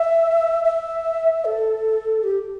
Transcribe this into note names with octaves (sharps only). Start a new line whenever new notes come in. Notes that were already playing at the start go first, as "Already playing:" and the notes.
Already playing: E5
E5
A4
G4